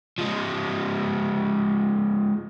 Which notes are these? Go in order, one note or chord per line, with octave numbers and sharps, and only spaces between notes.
F3 G#3